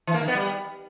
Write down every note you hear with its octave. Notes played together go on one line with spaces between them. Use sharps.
E3
A#3
D#3
B3
G3